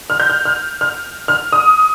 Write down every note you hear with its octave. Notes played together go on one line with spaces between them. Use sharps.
F6
G6
F6
F6
F6
F6
D#6